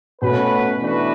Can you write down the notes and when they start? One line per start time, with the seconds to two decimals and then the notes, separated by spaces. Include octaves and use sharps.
0.22 B2 A3 C#4 F#4 B4
0.80 E3 A3 D4 F#4 B4